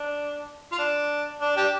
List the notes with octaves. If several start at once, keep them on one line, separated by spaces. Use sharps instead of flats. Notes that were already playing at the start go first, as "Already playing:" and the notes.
Already playing: D4
F4
D4
D4
D4 G4